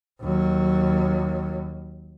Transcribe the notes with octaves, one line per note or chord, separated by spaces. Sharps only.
D#2 F#3